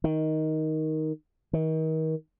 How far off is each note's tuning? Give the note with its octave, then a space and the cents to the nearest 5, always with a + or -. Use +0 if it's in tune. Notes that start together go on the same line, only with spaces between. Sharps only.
D#3 +10
D#3 +35